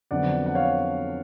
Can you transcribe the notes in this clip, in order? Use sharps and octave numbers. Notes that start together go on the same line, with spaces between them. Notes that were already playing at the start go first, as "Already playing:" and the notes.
F2 D3 F#3 B3 D5 F#5
F#5
C#5 F5